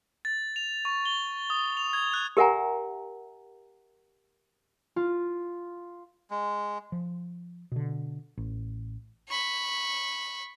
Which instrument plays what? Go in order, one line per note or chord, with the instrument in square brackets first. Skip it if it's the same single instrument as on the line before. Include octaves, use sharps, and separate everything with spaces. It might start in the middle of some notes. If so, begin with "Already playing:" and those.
[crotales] A6
F7
C#6
G7
D#6
F7
G#6
F#6
[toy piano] G4 A#4 E5 F#5 G#5 A#5
[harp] F4
[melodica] G#3
[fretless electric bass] F3
B2 D3
A1
[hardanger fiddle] B5 C#6